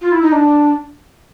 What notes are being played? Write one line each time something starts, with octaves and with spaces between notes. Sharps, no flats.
F4
E4
D#4
D4